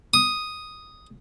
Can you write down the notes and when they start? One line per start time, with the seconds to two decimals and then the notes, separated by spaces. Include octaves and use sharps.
0.14 D#6